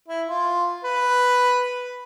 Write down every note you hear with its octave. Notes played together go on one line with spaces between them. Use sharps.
E4
F4
B4